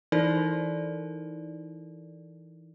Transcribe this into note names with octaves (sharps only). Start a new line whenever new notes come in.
E3 D#4 E4 A4 A#4 D5